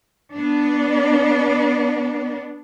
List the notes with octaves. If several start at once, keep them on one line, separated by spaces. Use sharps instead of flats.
B3 D4